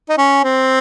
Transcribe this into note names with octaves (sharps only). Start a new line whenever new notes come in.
D#4
C#4
C4